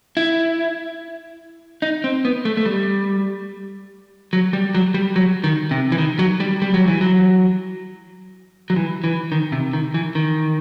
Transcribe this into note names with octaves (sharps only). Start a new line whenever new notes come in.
E4
D#4
C4
B3
A3
A3
G3
F#3
G3
F#3
G3
F#3
D#3
C3
E3
D#3
F#3
G3
G3
F#3
E3
F#3
F#3
E3
E3
D#3
C3
D#3
E3
D#3